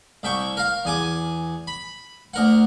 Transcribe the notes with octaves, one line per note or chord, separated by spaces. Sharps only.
C2 E5 G5 C#6
A#4 F5
E2 G#5 D6
B5
D2 A#4 F#5